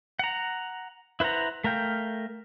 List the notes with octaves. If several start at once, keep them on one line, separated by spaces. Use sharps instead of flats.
F#5 A#5
E4 B4 C5 F#5 A#5
A3 A#4 F5 G5